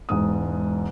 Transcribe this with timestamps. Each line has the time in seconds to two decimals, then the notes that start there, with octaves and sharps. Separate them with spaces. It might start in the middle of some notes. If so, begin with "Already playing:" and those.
0.09 E1 G#2 D#6